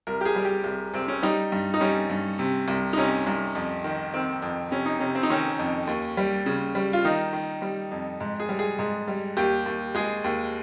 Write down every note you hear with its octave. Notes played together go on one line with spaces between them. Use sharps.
C2 A#4
G4
G#4
G3
G4
C2
C2 C4
C#4
G3 D#4
G2
D#4
G3 C#4
G2
C3
C2
D#4
C3 C#4
C2
F2
D#3
D#3 C4
F2
C3 C#4
D#4
C3 C#4
C4
D#4
D#3 C#4
F2
D#2
G3
C#3
G3
F4
D#3 D#4
D#3
G3
F2
G#2
G#4
G3
G#4
G#2 G#4
G3
D#2 G4
D#2
G#3 G#4
D#2